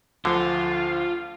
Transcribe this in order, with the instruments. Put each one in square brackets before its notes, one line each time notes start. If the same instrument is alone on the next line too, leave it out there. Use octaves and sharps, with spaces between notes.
[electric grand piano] D2 F3 [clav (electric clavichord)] D3 [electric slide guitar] F4